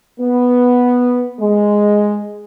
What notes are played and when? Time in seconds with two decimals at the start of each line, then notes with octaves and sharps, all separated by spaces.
0.20 B3
1.40 G#3